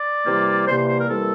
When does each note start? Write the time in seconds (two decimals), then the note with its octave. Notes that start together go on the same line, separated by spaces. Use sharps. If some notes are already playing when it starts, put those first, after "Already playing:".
Already playing: D5
0.26 C3 E3 G3 A#3
0.67 C3 E3 G3 A#3 C5
0.77 C5
0.89 C5
0.99 A#4
1.09 C3 E3 G3 A#3 A4